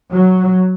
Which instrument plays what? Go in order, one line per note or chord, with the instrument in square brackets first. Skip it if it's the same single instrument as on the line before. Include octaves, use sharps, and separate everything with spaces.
[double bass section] F#3